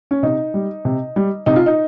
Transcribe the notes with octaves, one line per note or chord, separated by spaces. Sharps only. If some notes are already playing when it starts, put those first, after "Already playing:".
C#4
C3 D#4
G3
C3
G3
C3 D#4
F4
D#4